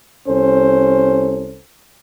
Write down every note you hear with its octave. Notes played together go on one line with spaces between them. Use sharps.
C2 C#4 A4 C5